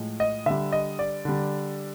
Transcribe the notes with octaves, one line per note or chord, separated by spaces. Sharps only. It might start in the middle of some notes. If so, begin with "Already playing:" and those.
Already playing: A2 F3 G#3
D#5
D3 G3 E5
D#5
D5
D3 G3